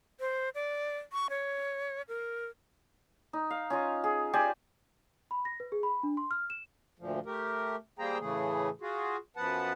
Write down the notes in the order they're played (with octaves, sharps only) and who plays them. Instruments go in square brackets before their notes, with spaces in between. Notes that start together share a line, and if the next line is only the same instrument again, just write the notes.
[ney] C5
D5
C#6
C#5
A#4
[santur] D#4
F5
C#4 F4 D#5
G#4
G4 C5 D5 G#5
[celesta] B5
A#6
B4
G#4
B5
D4
C6
F6
E7
[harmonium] D2 A#2 F3
A3 G4 A#4
G3 A#3 G#4 C5 G5 A#5
A2 C#3 E3 A3 G#4
F4 F#4 G#4
F#2 F3 B3 B4 F#5 A5